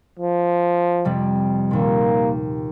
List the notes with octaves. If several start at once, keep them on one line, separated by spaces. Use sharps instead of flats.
F3
F2 C3 G3
D#2 A#2 A#3